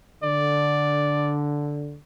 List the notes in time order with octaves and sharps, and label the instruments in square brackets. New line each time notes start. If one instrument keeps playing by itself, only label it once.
[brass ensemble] D3 [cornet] D5